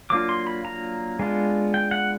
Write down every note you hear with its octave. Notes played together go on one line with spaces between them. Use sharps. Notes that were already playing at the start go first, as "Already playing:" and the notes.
F#3 A#3 D4 F4 D6
C6
B5
A#5
G#3 B3 D4 F4
G5
F#5